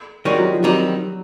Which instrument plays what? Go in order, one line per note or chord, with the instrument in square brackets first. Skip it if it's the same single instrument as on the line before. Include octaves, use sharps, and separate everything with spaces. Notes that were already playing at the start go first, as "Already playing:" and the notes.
[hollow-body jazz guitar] D#3 G#3 C#4 F#4 [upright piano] G3
[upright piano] F#3
F3
[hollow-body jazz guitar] D#3 G3 C4 D#4 [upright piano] F#3